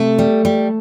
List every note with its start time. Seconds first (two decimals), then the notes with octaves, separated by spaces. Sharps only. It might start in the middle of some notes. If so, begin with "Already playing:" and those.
Already playing: C3 A3 A4
0.19 G3
0.45 G3